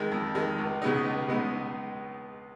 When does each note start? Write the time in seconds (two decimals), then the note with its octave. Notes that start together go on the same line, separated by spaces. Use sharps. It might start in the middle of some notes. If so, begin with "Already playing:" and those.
Already playing: F2 D#3 G#3
0.12 F2
0.35 D#3 G#3
0.58 C#2
0.82 C#3 G#3 B3 D#4
1.05 C#2
1.28 C#3 G#3 B3 D#4